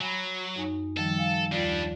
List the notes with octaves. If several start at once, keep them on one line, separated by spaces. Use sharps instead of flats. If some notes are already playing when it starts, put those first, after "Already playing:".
F#3 G#5 B5
F#2 D#4 G#5
D#3 F3 G3 A4
F5 G#5
D#2 G3 D4 F4 D5